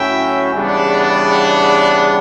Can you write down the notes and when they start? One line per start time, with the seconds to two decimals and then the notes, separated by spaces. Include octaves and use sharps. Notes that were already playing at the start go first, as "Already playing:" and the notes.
Already playing: A2 F#3 C#4 E4 E5 G5
0.54 E2 C#3 G3 B3 D4